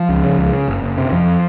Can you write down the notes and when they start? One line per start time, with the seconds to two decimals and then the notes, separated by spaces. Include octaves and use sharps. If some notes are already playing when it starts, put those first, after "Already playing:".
Already playing: F3
0.09 C#2
0.24 C#3
0.38 C#2
0.53 C#3
0.68 F#1
0.82 F#1
0.98 C3
1.12 F2 F3